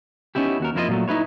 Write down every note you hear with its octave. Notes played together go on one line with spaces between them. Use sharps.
B3 C#4 D#4 E4 G4
D#2 F#4 A#4
F2 A#3 E4 F4 A#4 D#5
A#2 F#3 A3
D#4 E4 B4 C#5